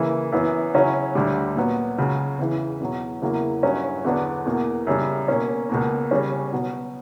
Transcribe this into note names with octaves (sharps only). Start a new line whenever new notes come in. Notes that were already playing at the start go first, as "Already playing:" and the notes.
Already playing: C#3 E3 A#3 E4
F#2 E3 B3
C#3 F#3 C#4 E4
D2 D3 G3
A#2 F#3 B3
C#2 C#3 F#3
E2 C#3 E3
E2 B2 F#3
E2 C#3 F#3 A#3 E4
G2 F#3 C#4 E4
E2 D3 F#3 B3 D4
E2 B2 A#3
F#2 C#3 G3
B2 A#3 C#4
C#2 B2 A#3
C#3 G3 C#4
B2 F#3 B3